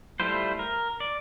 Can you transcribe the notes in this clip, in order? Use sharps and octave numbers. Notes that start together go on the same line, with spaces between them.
G3 A3 E4 F4 C5
A#4
D5